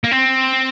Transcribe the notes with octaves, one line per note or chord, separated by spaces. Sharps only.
A#3
C4